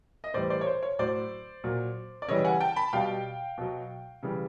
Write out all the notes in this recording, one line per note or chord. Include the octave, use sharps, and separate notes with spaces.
D#5
A2 E3 G3 C5 D5
C5 D5
C#5
C5
C#5
A2 F#3 C5 D5
A#2 F#3
D5
C#3 E3 G3 C#5 D#5
F#5 G#5
G5 A5
A5 B5
B2 G3 F5 G5
B2 F#3
C#3 E3 G3